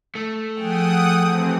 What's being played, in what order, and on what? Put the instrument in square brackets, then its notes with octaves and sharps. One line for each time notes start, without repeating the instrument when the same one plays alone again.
[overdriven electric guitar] A3
[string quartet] F3 G#4 G5 [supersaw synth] F#5 D#6
[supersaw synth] C3 E3 C4